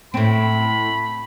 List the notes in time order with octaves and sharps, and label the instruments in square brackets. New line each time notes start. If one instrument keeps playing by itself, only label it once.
[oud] A2 C4 [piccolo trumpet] B5